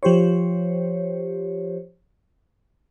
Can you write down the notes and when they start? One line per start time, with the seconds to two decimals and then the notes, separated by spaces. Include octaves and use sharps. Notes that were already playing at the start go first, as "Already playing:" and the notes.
0.03 F3 G4 C5 C#5